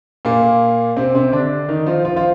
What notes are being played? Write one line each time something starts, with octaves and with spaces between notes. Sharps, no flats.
A#2 A#3
C3 C4
C3 C4
D3 D4
D#3 D#4
F3 F4
F3 F4
F3 F4